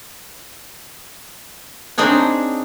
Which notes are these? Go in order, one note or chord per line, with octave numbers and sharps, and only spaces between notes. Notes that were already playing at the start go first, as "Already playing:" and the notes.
C4 D4 D#4 G#4 C#5